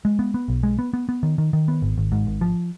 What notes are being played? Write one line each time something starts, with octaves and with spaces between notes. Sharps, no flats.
G#3
B3
B3
B1
G#3
B3
B3
B3
D#3
D#3
D#3
B3
G#1
G#1
G#2
G#1
F3